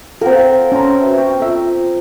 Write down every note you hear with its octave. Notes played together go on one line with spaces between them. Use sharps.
C4 A4 A#4 F5 F#5
C#4 C#5 A5 A#5 C6
F#4 B4 E5
B3 G5 C#6
F4 A4 E5